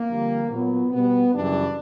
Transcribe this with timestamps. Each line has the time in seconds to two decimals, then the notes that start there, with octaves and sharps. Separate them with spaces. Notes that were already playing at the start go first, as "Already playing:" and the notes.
Already playing: A#3
0.09 F2 D3 G3
0.51 A#2 F#3 B3
0.92 B2 G3 B3
1.33 F#2 C#3 E3 G3 D4